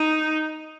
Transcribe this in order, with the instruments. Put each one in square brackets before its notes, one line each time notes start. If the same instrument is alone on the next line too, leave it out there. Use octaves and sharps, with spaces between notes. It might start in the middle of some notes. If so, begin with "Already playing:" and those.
Already playing: [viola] D#4